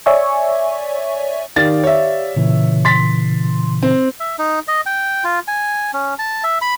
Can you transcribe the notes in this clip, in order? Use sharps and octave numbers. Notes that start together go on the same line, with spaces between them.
C#5 D5 E5 G#5 C#6
D#3 G4 D5 F5 A6
C#5 E5
A#2 C#3 E3
C6 A6 B6
C4
E5
D#4
D#5
G5
F4
G#5
C#4
A5
E5
B5